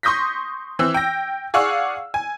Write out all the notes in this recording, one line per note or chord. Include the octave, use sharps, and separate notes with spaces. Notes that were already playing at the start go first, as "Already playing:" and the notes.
C6 C#6 D#6 G6 A#6 B6
E3 C4 E6
G5 A#6
G#4 D5 F5 F#5 C#6 E6
G#5